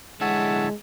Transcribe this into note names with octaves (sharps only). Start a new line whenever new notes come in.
D3 G#3 E4 C#5 E5 F#5 G#5 A5